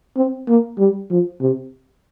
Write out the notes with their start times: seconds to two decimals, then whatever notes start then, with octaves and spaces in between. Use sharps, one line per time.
0.17 C4
0.48 A#3
0.79 G3
1.10 F3
1.41 C3